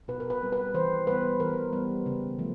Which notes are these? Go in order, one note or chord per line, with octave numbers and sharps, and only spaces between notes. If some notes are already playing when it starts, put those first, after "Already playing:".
B2 B4
A#4
B4
G3 C4
B4
E3 C5
G3 B3 B4
E3 A#4
G3 B3
C#3
F3 A3